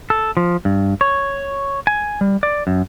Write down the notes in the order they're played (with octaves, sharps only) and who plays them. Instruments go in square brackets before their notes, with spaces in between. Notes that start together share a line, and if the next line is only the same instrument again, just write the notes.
[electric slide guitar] A4
F3
G2
C#5
G#5
G3
D5
F#2